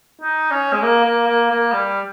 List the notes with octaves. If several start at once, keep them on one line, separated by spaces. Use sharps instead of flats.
D#4
C#4
G#3
A#3
A#3
A#3
A#3
G3